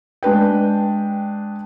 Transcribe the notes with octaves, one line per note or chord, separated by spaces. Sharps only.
G#3 D4 B4 G5